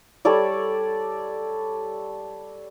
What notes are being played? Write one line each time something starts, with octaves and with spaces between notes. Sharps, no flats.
G3 A4 C#5 D5